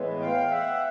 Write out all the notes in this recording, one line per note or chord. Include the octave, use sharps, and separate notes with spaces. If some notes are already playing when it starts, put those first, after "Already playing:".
Already playing: A2 E3 G#3 B3
F5 G5
E5 F#5